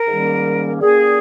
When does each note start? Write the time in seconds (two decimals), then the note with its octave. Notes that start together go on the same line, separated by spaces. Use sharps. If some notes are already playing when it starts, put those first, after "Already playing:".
Already playing: A#4
0.08 G#2 D#3 G3 A#3 C#4
0.81 A#2 G3 A#3 C#4 G#4